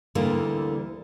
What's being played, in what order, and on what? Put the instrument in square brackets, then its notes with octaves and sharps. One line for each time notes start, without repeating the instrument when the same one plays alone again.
[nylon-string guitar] D2 D3 E3 G3 A#3 A#4